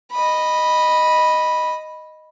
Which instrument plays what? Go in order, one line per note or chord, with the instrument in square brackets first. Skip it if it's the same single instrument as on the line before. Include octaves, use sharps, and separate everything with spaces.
[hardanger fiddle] D#5 B5